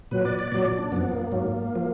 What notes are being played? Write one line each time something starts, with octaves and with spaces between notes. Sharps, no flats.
A#2 F#3 B4
D5
D5
A#2 F#3 D5
D4
F#2 F3 B3
A#3
G#2 F#3
F3